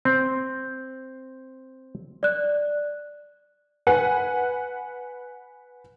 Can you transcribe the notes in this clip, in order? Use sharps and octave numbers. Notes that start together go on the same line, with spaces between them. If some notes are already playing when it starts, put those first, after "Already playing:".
C4 G6
D5 F#6
B4 F#5 G#5